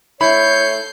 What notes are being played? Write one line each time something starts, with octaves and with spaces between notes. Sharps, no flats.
A3 E4 C#5 B5 G6 C7